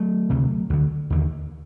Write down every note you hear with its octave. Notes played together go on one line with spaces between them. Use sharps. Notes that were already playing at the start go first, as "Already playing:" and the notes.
Already playing: F#3 A3
D2 C3
D2 D3
D#2 D3